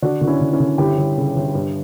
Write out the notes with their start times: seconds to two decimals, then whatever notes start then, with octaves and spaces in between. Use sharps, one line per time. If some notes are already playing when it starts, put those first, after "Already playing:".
0.02 D3 D4 F#4
0.21 D3 F#4
0.27 C#4 E4
0.41 D3
0.53 C#4 E4
0.60 D3
0.78 G1 E4 G4
0.98 G1
1.17 C#3
1.36 G1
1.55 G2